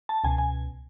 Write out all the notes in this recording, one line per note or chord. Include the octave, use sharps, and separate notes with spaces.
A5
C#2 B2 G#5
G#5